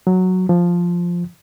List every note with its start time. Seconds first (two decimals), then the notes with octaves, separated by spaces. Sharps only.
0.07 F#3
0.49 F3